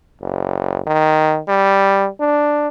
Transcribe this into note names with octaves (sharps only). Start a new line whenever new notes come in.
F#1
D#3
G3
D4